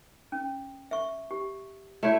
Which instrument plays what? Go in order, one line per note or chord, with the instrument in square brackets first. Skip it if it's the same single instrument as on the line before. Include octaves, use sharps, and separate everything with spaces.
[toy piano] C#4
E5 C#6
G4
[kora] A3 E4 [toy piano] F#4 C#5 D5